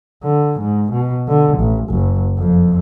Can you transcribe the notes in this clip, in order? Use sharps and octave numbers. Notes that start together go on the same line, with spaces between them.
D3
G#2
B2
D3
A1
F#1
F2